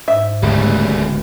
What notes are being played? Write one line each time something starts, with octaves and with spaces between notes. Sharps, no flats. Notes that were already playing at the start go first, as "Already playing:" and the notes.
G#2 E5
D1 C#2 G3 A3